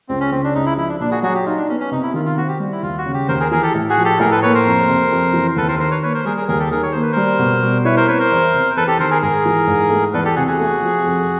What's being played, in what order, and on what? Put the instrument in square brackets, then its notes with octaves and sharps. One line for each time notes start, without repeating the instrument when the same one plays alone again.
[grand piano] C#2 [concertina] C4
[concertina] C#4
[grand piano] C#3 [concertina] C4
[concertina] D4
[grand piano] C#2 [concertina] D#4
[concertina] E4
[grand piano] F3 [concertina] E4
[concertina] D4
[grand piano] A#2 [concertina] D4
[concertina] F#4 G#4
[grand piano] F#3 [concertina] F#4 G#4
[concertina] G4
[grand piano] D#4 [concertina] F4
[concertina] D4
[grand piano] B3 [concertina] C#4
[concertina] C#4
[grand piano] C3 [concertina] D#4
[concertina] E4
[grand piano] D#3 [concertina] F4
[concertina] F4
[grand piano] C4 [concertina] F#4
[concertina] G4
[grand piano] G3
[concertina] E4
[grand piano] D#2 [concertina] F4
[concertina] F#4
[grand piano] C#3
[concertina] G4
[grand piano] D#2 [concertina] A#4 C5
[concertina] G#4 A#4
[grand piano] E3 [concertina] G#4 A#4
[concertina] G4 A4
[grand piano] A2
[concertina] F#4 G#4
[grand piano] F3
[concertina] G4 A4
[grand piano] A2 [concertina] G#4 A#4
[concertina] A4 B4
[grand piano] A#3 [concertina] B4 C#5
[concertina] A#4 C5
[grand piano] F2
C3
F2
E3
[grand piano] D#2 [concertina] A4 B4
[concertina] A#4 C5
[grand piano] D#3 [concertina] A#4 C5
[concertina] B4 C#5
[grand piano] A#3 [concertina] B4 C#5
[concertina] A#4 C5
[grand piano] G3 [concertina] G#4 A#4
[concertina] G#4 A#4
[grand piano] D#2 [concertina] G#4 A#4
[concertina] G4 A4
[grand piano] D#3 [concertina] G#4 A#4
[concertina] C#5
[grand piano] A#3 [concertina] C5
[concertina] B4
[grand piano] G3 [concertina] A#4 C5
[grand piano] B2
G3
[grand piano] E4 [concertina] B4 C#5
[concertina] A#4 C5
[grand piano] C4 [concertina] B4 C#5
[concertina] A#4 C5
[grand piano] E2
C3
[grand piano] E2 [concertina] A4 B4
[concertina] G4 A4
[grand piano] D#3 [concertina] A#4 C5
[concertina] G#4 A#4
[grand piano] G#2 [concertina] G#4 A#4
[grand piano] E3
G#2
A3
[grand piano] E2 [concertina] A4 B4
[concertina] G4 A4
[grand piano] C3 [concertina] F#4 G#4
[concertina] F#4 G#4
[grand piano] A3
F3
F2